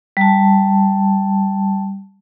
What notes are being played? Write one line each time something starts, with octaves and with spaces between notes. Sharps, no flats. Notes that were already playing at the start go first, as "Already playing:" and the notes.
G3 A5